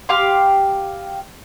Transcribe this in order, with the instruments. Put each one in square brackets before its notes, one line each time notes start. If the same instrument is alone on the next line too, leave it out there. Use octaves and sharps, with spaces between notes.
[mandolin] G4 F5 C6